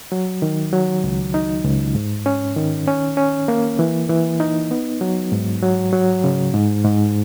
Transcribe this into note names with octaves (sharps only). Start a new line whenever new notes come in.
F#3
D#3
F#3
C#2
D#4
C#2
G#2
C#4
D#3
C#4
C#4
A#3
E3
E3
D#4
B3
F#3
G#2
F#3
F#3
C#3
G#2
G#2